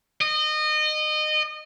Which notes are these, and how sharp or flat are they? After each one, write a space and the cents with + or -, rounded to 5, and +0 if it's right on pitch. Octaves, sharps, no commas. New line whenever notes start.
D#5 -25